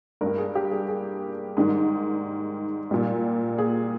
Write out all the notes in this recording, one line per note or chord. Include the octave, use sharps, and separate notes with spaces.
G2 A#4
G3
G#4
G4
G#4
G#4
G#2 D#3 G3
A#2 G3
G#4